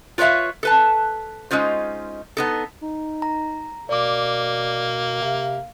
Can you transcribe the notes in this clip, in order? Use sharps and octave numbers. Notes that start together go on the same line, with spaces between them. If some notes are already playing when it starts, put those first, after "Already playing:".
F4 B4 C#5 D5 E5 F5
A4 B4 A5
G#3 C#4 D#4 F4 C5
B3 D#4 A4
D#4
A#5
B2 A#3 D5 D6
C3 F5